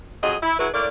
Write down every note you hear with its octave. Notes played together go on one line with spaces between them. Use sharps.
F2 F#3 G#4 D#5
E4
F#3 E4 F#4 G#4 B4
A2 A#3 D4 D5